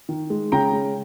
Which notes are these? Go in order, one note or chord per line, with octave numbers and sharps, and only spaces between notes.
D#3
G#3
C#3 G5 A#5
G#3